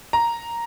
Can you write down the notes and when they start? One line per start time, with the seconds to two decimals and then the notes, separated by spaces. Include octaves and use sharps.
0.13 A#5